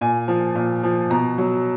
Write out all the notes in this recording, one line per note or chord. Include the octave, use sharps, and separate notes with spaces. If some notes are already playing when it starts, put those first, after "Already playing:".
A#2 G#5
F3
A#2
F3
B2 A#5
F#3